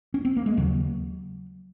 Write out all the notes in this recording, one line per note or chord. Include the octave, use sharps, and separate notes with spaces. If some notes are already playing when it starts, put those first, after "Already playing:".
C#4
C4
A#3
G#3
D#2 C#3 F#3